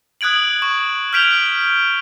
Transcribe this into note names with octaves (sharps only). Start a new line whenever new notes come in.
D#6 F#6 G#6 D7 F#7
C#6
F6 G6 B6 D7 F7 G7